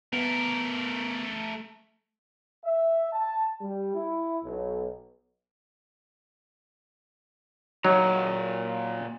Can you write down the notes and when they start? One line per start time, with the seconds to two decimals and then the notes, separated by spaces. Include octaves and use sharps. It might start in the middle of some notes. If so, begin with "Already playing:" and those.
0.13 A3 B3 A#4
2.64 E5
3.12 A5
3.60 G3
3.94 E4
4.42 B1
7.85 A#2 F#3 D#4 F#5 A#5